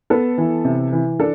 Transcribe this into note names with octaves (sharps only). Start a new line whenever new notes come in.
B3 A4
E3
C3
E3
D4 A4